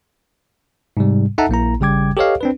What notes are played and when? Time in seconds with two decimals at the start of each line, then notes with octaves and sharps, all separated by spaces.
0.97 G#2 C3 G3
1.38 D#4 A4 E5 F#5 A5 A#5
1.49 A#1 A#3 E4 A#5
1.80 G#1 C#3 G3 G5 D6 G#6
2.17 G4 A4 B4 C#5 D#5 F5
2.41 C4 D4 B4